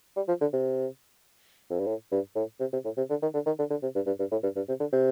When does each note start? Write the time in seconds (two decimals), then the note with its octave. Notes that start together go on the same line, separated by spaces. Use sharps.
0.16 G3
0.28 F3
0.41 D3
0.53 C3
1.70 F2
1.79 G2
1.87 A2
2.12 G2
2.36 A2
2.60 C3
2.73 C3
2.85 A2
2.97 C3
3.10 D3
3.22 D#3
3.34 D3
3.46 D#3
3.59 D3
3.70 D3
3.82 C3
3.95 G2
4.06 G2
4.19 G2
4.31 A2
4.43 G2
4.56 G2
4.68 C3
4.80 D3
4.93 C3